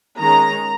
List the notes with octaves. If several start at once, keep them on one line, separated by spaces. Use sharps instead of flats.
D#3 G#3 C#4 A#5